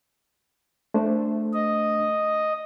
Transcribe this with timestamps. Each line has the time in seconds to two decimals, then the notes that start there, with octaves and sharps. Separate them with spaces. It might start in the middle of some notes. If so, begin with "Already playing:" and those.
0.94 A3 D4 C5
1.53 D#5